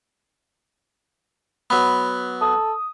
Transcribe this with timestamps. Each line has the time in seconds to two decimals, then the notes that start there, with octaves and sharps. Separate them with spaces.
1.70 F#3 B3 B5
2.41 A4 D#6